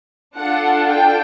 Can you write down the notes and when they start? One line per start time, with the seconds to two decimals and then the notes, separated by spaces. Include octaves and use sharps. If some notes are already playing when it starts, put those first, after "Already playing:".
0.37 D4 F4 A4 F#5
0.89 G5